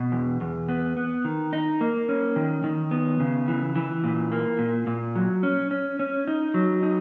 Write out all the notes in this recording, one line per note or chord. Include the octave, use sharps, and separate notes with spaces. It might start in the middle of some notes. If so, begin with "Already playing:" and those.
Already playing: B2
E2
E2
B3
B3
D#3
D#4
A#3
C#4
D#3
D#3
B3
C#3
E3
E3
A#2
A#3
A#2
A#2
F#3
C#4
C#4
C#4
D#4
F#3
D#4